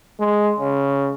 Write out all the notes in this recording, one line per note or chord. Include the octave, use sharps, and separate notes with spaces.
G#3
C#3